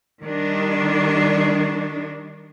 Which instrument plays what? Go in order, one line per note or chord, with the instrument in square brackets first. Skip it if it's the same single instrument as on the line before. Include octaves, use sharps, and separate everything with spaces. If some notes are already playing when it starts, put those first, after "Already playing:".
[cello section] D#3 G3 D4